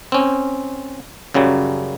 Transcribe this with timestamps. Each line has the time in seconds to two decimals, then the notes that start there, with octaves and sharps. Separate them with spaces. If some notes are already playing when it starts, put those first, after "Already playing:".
0.12 C4 C#4
1.34 F#2 C#3 F#3 G3